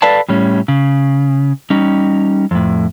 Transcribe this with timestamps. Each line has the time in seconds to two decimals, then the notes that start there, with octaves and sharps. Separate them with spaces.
0.02 A4 B4 D5 F5 A5
0.29 A2 G3 C#4
0.68 C#3
1.70 G3 C#4 D#4
2.51 F2 A2